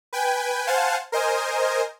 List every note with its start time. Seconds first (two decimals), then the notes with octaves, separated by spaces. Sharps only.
0.13 B4 G5 G#5
0.67 C5 F5 F#5 G#5 A5
1.12 A#4 C5 D#5 G#5